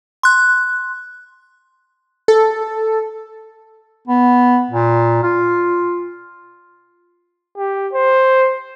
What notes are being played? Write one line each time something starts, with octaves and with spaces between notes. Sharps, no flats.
C6 F#6
A4
B3
A#2
F4
G4
C5